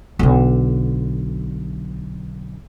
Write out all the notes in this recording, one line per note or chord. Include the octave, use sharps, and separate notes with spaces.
B1 D3